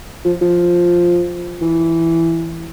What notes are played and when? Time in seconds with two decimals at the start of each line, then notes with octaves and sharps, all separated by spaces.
0.25 F3
0.42 F3
1.62 E3